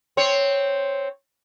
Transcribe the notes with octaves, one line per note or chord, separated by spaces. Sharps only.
C4 C#5